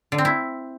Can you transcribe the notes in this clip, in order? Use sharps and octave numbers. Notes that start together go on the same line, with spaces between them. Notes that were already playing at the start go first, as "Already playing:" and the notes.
D3
C4
E4